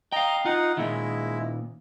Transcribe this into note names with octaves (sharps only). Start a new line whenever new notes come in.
D#5 F5 G5 A#5
D#4 F4 F#5
A#2 D#3 G#3 E4